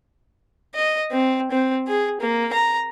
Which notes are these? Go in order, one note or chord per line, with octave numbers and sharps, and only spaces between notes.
D#5
C4
C4
G#4
A#3
A#5